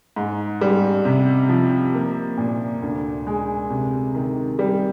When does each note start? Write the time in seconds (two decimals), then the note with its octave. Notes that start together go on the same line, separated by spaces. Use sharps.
0.16 G#2
0.61 G3
1.05 C3
1.49 F3
1.94 A#3
2.37 A#2
2.82 D2
3.27 G#3
3.70 C3
4.15 D#3
4.59 G3